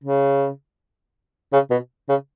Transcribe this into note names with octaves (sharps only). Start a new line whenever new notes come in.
C#3
C#3
B2
C#3